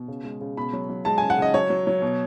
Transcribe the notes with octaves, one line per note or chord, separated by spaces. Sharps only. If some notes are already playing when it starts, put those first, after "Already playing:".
Already playing: B2
C#3
G#3
C#3
B2 B5
F#3
F#3
G#3 A5
C#3 G#5
F#5
C#3 D#5
F#3 C#5
F#3
F#3
B2